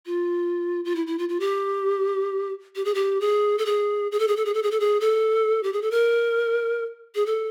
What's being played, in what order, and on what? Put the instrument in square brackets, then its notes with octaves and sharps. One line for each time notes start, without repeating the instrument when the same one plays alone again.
[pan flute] F4
F4
E4
E4
F4
F4
G4
G4
G#4
G4
G#4
A4
G#4
G#4
A4
G#4
A4
G#4
A4
G#4
A4
G#4
A4
G4
G#4
A4
A#4
G#4
A4